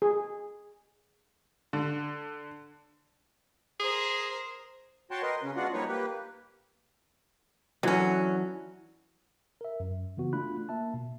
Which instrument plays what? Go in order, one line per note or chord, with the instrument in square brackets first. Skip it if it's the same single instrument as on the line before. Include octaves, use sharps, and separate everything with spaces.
[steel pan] G#4
[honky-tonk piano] D3
[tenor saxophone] G#4 [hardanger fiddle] A#4 C5
[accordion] F#4 C#5 G5 A5 C6
A#4 B4 D#5 C6
C#3 C#4
G#3 B3 D4 F4 F#4 F#5
F3 G3 A#3 D#4 B4 C#5
A#3 G4 B4
[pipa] D3 C#4 [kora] E3 F#3
[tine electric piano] A#4 E5
F#2
C#3 E3 B3 F#4
A3 D4 F4 B5 F#6
A#3 E5 A5
B2